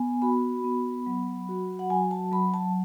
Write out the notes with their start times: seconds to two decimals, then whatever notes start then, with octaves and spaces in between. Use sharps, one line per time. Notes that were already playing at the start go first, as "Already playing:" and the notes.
Already playing: B3 G#5
0.22 F#4 B5
0.64 B3
1.06 F#3
1.49 F#4
1.79 F#5
1.90 F#3 G#5
2.11 A5
2.32 F#3 B5
2.54 A5